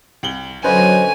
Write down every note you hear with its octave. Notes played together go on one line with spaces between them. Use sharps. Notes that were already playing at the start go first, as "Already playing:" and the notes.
C2 F#7 G7
D3 F#3 C#4 B4 C5 D#5 G#5